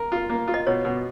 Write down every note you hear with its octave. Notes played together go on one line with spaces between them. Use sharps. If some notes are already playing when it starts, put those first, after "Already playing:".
Already playing: A#4
F4
A#3
F4
D#5
B2 C#5
B2